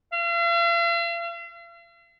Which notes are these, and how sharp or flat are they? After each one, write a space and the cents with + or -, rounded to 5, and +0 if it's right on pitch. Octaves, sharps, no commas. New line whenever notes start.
F5 -45